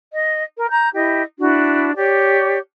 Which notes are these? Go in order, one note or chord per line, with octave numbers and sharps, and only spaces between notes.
D#5
A#4
A#5 G6
E4 G4 D#5
D4 E4 F#4
G4 C#5 D5